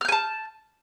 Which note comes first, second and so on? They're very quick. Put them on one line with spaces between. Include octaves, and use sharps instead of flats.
F6 G6 G#5 A5